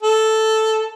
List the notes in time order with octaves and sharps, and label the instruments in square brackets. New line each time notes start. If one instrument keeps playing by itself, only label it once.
[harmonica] A4